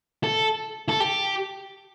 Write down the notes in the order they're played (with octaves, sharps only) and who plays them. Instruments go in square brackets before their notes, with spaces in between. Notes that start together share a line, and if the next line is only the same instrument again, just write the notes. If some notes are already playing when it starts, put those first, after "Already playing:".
[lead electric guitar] A4
A4
G4